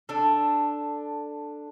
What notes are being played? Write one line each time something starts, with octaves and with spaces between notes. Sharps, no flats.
D4 A4